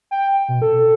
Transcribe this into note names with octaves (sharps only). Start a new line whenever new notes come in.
G5
B2
A4